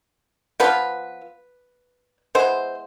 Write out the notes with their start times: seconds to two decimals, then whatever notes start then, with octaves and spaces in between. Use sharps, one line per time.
0.60 F3 B3 D4 F4 B4
2.35 G#3 B3 E4 C5